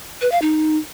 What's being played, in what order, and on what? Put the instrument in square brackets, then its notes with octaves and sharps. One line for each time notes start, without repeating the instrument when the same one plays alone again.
[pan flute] B4
F5
D#4